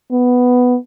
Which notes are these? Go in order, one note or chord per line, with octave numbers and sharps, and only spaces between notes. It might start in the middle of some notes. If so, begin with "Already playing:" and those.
B3